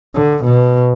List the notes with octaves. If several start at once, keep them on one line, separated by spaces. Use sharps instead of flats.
D3
B2